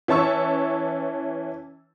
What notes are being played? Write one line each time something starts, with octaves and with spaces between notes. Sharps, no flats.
E3 C#4 A5 C#6 E6